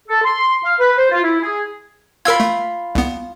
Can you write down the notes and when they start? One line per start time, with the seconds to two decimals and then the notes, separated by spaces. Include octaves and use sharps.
0.09 A4
0.24 C6
0.65 F5
0.81 B4
0.98 C5
1.11 F4
1.24 E4
1.43 G#4
2.25 F4 A#4 B5 E6 G#6
2.40 A3
2.95 C2 B3